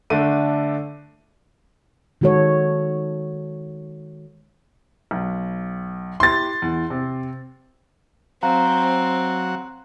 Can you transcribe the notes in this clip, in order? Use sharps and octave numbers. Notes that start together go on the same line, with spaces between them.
D3 A3 D4 D#7
D#3 G#3 F#4 A4 C#5
B1
E4 G4 C6 A6
E2
C3
F#3 C4 F5 F#5 A#5